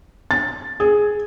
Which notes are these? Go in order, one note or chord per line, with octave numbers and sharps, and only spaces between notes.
A6
G#4